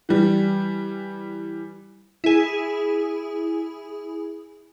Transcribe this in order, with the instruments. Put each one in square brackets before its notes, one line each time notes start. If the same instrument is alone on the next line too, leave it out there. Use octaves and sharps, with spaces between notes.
[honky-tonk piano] E3 G3
[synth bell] E4 G#4